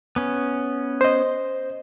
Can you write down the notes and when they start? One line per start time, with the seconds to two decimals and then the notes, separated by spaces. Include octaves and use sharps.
0.16 B3 C#4
1.01 C5 D#5